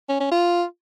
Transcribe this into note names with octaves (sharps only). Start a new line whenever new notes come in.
C#4
C#4
F4